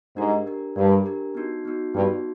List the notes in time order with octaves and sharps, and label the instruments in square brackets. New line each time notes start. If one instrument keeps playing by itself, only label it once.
[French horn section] G#2 [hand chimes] D4 G4 A#4
[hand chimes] D4 G4 A#4
[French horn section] G2 [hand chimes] D4 G4 A#4
[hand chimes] D4 G4 A#4
B3 D#4 F#4
B3 D#4 F#4
[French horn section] G2 [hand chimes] B3 D#4 F#4